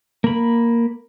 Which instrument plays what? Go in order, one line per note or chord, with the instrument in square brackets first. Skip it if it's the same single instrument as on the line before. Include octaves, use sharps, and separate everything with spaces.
[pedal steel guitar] A#3 B5